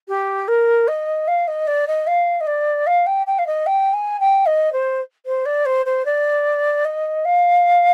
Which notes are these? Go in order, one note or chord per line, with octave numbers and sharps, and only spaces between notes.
G4
A#4
D#5
F5
D#5
D5
D#5
F5
D#5
D5
F5
G5
G5
F5
D#5
G5
G#5
G5
D#5
C5
C5
D5
C5
C5
D5
D#5
F5